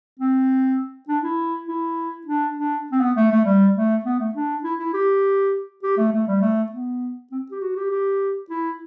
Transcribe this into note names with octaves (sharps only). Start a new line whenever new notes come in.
C4
D4
E4
E4
D4
D4
C4
B3
A3
A3
G3
A3
B3
A3
D4
E4
E4
G4
G4
A3
A3
G3
A3
B3
C4
G4
F#4
G4
G4
E4